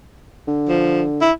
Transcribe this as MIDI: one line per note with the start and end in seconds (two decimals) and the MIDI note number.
0.48 1.25 50
0.69 1.03 53
1.21 1.31 64